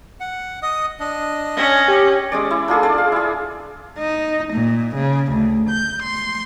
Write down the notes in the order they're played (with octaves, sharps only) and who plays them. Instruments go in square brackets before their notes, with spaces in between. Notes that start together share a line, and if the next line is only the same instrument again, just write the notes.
[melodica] F#5
D#5 D#6
D4 D#5
[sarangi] C#4 [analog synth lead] A#6
[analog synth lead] G4
[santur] G#3 C#4 D5
E4
D4 F4 G#4 A4
D4 G#4 D5 A5
F5
E4 G#4
[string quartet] D#4
A#2
C#3
D2
G6
C6